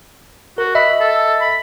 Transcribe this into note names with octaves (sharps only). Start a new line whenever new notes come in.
F#4 A#4
D#5 E5 B5 E6
A4
B5